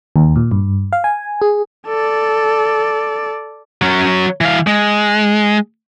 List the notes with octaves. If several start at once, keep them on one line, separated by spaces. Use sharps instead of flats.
D#2
A#2
G2
F5
G#5
G#4
A4 D5
F#3 C#4
E3 F5
G#3